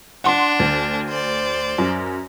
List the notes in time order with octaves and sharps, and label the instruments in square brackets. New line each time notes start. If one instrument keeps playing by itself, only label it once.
[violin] D4 [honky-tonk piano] F#5 C6
[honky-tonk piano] D2
[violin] C5 D5
[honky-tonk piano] F#2